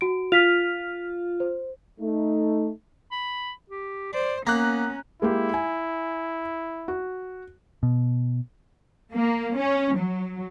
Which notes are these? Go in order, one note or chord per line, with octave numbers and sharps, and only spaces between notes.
F#4 D7
F4 F6 B6 F7
C5
A3 D#4
B5
G4
C5 D5
A#3 B3 C#4 A#5 F#6
G#3 A#3 E4 G4
G#5
F#4
B2
A#3
C#4
F#3